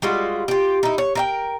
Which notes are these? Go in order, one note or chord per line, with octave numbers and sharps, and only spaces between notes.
G3 G#3 F4 F#4
F4 G4
D#4 E4
C#5
A#4 E5 G5